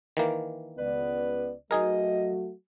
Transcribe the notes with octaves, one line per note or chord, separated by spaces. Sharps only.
D#3 E3 A#3
C#2 B3 B4 D5
F#3 A3 D#4 F#4 G#4 A#4 D#5